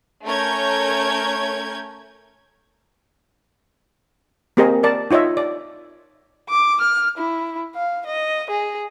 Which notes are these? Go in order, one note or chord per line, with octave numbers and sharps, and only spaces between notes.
A3 C#4 A#4 C#5 G6 G#6
A#3 C4 G4 G#4 A#4 D#5
A#4 D5 A5
D#4 F4 C#5 D#5 E5
D5
D6
F6
E4
F5
D#5
G#4